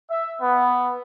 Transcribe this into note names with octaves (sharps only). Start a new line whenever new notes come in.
E5
B3